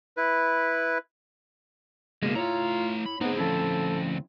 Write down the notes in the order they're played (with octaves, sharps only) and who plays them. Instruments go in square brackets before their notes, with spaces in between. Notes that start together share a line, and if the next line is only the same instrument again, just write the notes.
[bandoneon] E4 B4
[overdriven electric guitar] C#2 B2 [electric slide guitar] G#3 A#3
[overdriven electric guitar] A3 A#5 [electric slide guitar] E4 C#5 [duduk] F4
[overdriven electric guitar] B5
[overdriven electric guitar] D2 C4 [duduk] B3 [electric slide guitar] D#4 G#4
[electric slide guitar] F3 C#4 E4 [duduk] A4